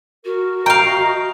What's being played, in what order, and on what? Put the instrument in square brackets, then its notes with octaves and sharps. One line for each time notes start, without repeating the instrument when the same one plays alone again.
[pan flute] F#4 [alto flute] A#4
[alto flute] D#5 [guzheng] F5 G5 [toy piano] A#5